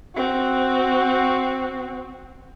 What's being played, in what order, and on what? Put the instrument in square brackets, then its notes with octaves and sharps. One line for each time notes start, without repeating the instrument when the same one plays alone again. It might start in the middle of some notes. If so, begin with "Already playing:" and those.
[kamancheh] C4 F#4